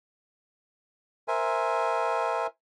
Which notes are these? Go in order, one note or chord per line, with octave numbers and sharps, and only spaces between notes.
A#4 C5 E5 G#5